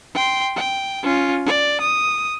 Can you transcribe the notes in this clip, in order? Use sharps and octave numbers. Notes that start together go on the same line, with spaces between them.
G5 C6
G5
C#4 F4
D5
D#6